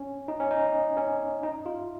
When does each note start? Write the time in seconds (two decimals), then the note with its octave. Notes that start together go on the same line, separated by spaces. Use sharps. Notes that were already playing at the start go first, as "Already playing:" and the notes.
Already playing: C#4
0.28 D#4
0.40 C#4
0.51 D#4
0.97 C#4
1.43 D#4
1.66 F4